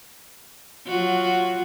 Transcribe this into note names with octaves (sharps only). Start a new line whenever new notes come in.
F#3 F4 F#4